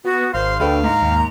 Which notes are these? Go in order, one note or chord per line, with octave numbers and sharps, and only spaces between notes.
B3 F#4
G#1 C5 F5 C6
D2 D4 A4 B4 F5 G5
G#2 A#5
D#2